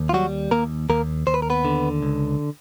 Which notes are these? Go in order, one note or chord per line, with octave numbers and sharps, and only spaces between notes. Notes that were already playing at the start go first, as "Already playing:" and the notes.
Already playing: D#2
F4
F#3 G3 F#4
D#2 A#3 A#4
D#2 A#3 A#4
D#2 C5
B4
A#4
B3 B4
D3
C#2